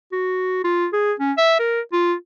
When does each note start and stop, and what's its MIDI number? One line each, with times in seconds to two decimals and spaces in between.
0.12 0.61 66
0.65 0.87 65
0.93 1.13 68
1.20 1.33 61
1.38 1.56 76
1.59 1.81 70
1.93 2.14 65